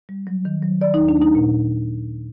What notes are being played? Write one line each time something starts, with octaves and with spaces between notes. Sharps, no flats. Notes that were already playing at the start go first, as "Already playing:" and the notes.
G3
F#3
D#3
F#3
D#3 D5
D#4
D#2
D4
A3 D#4
A#2